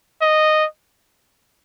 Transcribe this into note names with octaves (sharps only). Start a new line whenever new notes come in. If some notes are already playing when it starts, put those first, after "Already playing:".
D#5